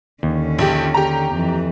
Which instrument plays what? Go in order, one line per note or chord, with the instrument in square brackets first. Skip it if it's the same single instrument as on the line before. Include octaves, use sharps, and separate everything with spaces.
[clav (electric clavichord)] D#2 [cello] D3 C#4
[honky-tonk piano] A#1 G4
G4 A#5
[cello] F2 E3